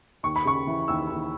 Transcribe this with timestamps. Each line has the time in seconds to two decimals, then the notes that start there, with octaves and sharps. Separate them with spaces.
0.23 D#2 C#6
0.36 B5
0.45 C#3 C#6
0.67 E3
0.88 D#2 E6
1.10 D#2